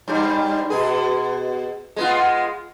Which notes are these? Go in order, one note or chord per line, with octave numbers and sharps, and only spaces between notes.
G2 G3
B2 G#4
G#3 B3 F4